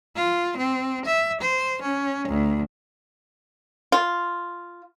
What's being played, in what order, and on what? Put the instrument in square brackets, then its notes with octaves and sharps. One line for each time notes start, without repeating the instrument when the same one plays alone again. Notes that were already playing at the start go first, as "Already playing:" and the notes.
[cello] F4
C4
E5
C5
C#4
D2
[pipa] F4